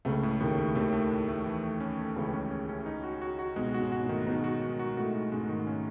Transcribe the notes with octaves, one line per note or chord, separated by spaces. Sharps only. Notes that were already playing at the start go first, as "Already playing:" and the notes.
C#2 C#3 A3
A2
D#2 A2 D#3
A3
D#2 D#3 A3
A3
A2
A3
E3
A3
C#4
A3
C#2 C#3 E3
C#4
C#4
C#4
D#4
F#4
F#4
F#4
B1 B2 G#3
F#4
G#2
F#4
A2
D#3
B1 B2 D#4
F#4
F#4
F#4
A2 F#4
F#4
G#2 G#3
D#3
C#4